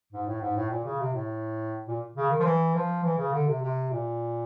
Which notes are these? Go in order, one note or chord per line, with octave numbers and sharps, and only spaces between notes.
G#2
A2
G#2
A2
A#2
C#3
C3
A2
A#2
C#3
D#3
F3
E3
F3
E3
C#3
D3
C3
C3
A#2